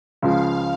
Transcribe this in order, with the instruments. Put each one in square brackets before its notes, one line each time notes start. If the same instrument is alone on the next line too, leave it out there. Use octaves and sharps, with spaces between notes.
[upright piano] C#2 C#3 F3 [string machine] F5